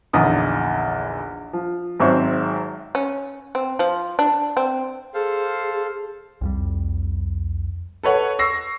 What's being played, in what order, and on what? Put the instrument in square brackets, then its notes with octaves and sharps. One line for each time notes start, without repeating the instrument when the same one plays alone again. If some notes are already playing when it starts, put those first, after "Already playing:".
[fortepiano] A#1 E2 D3 D#4 D#6
F3
G#1 G#2 F#3 C4 E5 C#6
[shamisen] C#4
C4
F3
D4
C4
[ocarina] G#4 [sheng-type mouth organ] A4 C5 F5
[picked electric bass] C2 F2 G3
[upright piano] A4 B4 C#5 F#5
C#6 E6 A#6 C7